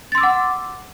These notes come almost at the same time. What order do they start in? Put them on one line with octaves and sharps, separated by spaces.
A6 C6 E6 D6 F#5